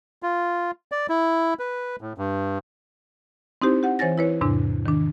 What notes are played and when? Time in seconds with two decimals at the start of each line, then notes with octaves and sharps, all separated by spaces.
0.23 F4
0.92 D5
1.09 E4
1.59 B4
2.01 A2
2.18 G2
3.62 C4 D#4 E4 G4 C5
3.83 G4 F#5
3.99 E3 C5 C#5 G#5 A6 A#6
4.18 E4 B4 C#5
4.41 E2 G#2 C3 D4
4.86 D#3 D4